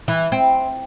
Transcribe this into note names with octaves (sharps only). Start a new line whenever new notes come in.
E3
C4